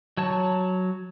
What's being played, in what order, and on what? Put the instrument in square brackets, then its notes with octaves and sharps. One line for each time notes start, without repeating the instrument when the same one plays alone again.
[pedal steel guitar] F#3 C#5 A5